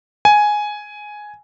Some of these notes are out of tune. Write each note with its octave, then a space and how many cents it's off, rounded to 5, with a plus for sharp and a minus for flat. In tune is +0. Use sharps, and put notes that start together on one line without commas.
G#5 +5